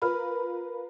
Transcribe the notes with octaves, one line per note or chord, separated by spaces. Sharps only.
F4 A#4 B4 B5 F6